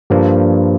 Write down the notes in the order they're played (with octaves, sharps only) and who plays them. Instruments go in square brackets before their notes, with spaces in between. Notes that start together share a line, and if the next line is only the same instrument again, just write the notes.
[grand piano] G2 [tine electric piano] F3 A#3 D4